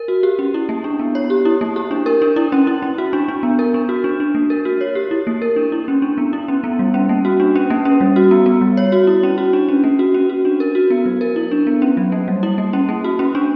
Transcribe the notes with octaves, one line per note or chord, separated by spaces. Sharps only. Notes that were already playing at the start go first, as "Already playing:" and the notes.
Already playing: A#4
F#4
G4
C#4
E4
A#3
D4
B3
C#5
G4
E4
A#3
G4
D4
A#4
D4
E4
C#4
E4
C#4
F#4
D4
D4
B3
A#4
D4
F#4
D4
D4
A#3
A#4
F#4
C#5
G4
E4
A#3
A#4
D4
E4
C#4
D4
B3
E4
C#4
B3
G3
C#4
A#3
F#4
D4
C#4
A#3
C#4
G3
F#4
B3
B3
G3
C#5
F#4
E4
C#4
F#4
D4
C#4
A#3
F#4
C#4
F#4
D4
A#4
F#4
B3
F#3
A#4
E4
D4
B3
C#4
F#3
A#3
G3
E4
A#3
C#4
A#3
F#4
C#4
D4